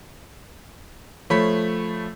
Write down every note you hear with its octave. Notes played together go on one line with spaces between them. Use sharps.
F3 A3 C#5 B5 B6